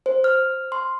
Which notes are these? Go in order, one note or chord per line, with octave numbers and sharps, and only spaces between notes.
C5
F6
C6